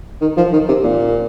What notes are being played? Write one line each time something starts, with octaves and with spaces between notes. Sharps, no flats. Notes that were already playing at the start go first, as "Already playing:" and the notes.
D#3
F3
D#3
C3
A#2